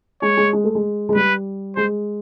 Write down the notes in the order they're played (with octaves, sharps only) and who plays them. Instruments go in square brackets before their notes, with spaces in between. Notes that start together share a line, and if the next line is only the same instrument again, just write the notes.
[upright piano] G#3 [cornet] C#5
[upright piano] G#3
G#3
A3
G#3
G#3
[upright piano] G3 [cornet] B4
[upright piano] G#3 [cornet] C5